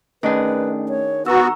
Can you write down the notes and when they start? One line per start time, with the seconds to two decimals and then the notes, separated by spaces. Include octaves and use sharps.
0.23 D#3 A3 C#4 D4 G#4 B4
0.89 C#5
1.26 B3 F#4 F#5 A#5 C#6 E6